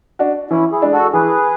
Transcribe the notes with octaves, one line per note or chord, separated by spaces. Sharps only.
D4 F#4
E3 C#4 E4
E4 G#4
G#3 D4
F#4 A4
E3 G#4 B4